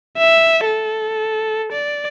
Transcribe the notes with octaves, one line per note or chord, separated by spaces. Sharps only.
E5
A4
D5